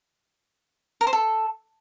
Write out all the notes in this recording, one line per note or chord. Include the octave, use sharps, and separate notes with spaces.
A#4
C5
A4